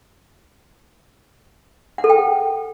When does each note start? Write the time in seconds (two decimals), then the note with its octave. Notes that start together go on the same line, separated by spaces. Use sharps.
1.98 F#5
2.04 A4
2.10 G5